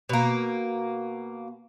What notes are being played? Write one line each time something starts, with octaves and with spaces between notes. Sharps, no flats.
B2 A#3